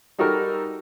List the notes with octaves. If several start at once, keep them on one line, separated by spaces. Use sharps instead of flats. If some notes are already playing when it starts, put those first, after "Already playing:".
G3 D#4 F#4 A4 A#4